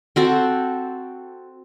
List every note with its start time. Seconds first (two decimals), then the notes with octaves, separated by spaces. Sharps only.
0.16 C4 F#4 A4